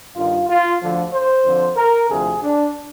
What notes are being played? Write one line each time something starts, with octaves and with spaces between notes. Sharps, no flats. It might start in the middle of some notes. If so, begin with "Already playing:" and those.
G2 D#3 F4
F4
D2 D3 F3
C5
F2 D3 F3
A#4
D2 C3 F3 G#4
D4